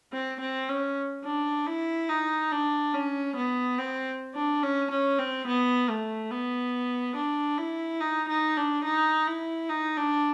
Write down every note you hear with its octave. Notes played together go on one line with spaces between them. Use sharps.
C4
C4
C#4
D4
E4
D#4
D4
C#4
B3
C4
D4
C#4
C#4
C4
B3
A3
B3
D4
E4
D#4
D#4
D4
D#4
E4
D#4
D4